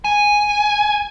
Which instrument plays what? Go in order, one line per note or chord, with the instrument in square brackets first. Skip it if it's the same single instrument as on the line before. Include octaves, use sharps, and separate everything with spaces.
[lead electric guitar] G#5